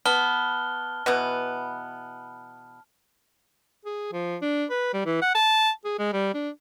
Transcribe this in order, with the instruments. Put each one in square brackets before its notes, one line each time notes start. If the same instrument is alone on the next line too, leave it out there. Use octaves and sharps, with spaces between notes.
[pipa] B3 [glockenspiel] A5 F6 G7
[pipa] B2 E3 B3
[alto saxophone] G#4
F3
D4
B4
G3
E3
F#5
A5
G#4
G#3
G3
D4